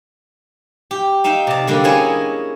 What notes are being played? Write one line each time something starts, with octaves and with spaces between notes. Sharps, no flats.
G4
D#4 E5 F5 G5
C3 D5
D3 G3 A#3
A#3 C#4 E4 G#4 C#5 D#5